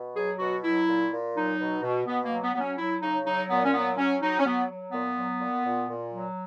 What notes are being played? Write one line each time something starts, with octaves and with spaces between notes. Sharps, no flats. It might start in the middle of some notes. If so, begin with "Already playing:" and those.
Already playing: B2
F#3 G#4
B2 F#4
F#3 E4
A#2
A#2
F#3 D#4
B2
B2
B2 B3
A#3
F#3
B3
F#3 B3
C#4
F#3 E4
C#3 D#4
F#3 D#4
A#2 B3
C#4
F#3 B3
F#3 C#4
F#3 D#4
C#4
F#3 B3
F#3
A#2 B3
F#3
A#2
A#2
A#2
F#3